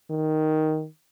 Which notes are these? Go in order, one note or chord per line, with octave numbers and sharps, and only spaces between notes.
D#3